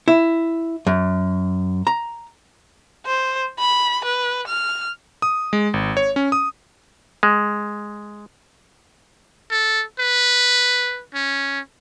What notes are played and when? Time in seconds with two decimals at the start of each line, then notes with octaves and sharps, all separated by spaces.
0.08 E4
0.87 F#2
1.87 A#5
3.06 C5
3.59 B5
4.05 B4
4.48 F6
5.22 D#6
5.53 G#3
5.74 G#1
5.97 C#5
6.16 C#4
6.32 D#6
7.23 G#3
9.50 A4
9.99 B4
11.14 C#4